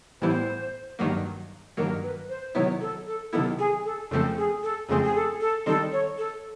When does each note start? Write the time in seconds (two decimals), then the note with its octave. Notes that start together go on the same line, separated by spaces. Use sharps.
0.21 A2 E3 G3 B3 E4 C5
0.99 G2 D#3 F#3 A#3
1.77 G2 D#3 F#3 A#3 A#4
2.03 B4
2.29 C5
2.55 C3 D#3 F#3 B3 E4 C#5
2.81 A4
3.07 A4
3.33 C3 D#3 F#3 B3 E4 A4
3.59 G#4
3.85 A4
4.11 F2 C#3 F3 A3 C4 A4
4.37 G#4
4.63 A4
4.89 F2 C#3 F3 A3 C4 G#4
5.03 G#4
5.15 A4
5.41 A4
5.66 D#3 G3 C4 D#4 A4
5.92 C#5
6.18 A4